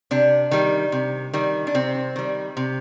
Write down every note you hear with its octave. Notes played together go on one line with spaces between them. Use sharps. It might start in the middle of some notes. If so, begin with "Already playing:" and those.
C3 D4
D#3 G3
C3
D#3 G3
D4
C3 C4
D#3 G3
C3